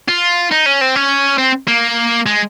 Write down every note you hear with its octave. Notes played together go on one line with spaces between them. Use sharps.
F4
D#4
C#4
C4
C#4
C4
A#3
G#3